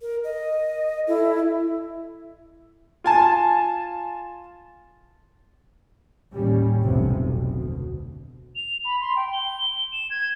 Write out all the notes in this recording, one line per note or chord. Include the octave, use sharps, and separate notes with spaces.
A#4
D#5
E4 A4
F4 G#5 A5
A1 D#2 G3 C#4
F1 B1 C3
D2 B2
F7
B5
C6
G5
G7
E7
G#6